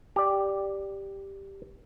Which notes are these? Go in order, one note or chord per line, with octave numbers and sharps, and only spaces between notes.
G4 D5